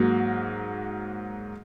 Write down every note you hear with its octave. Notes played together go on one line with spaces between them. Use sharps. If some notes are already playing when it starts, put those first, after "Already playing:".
Already playing: G#2 F#3 A#3